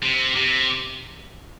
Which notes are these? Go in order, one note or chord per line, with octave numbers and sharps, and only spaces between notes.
C3
C3